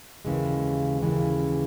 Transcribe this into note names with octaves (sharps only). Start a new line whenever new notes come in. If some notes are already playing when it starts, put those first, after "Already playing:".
D#2 C#3 E3 G#3
D#2 C#3 E3 G#3